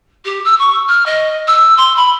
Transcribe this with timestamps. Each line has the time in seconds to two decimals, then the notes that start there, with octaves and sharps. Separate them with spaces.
0.25 G4
0.45 E6
0.59 C#6
0.88 F6
1.06 D#5
1.48 E6
1.78 C6
1.96 B5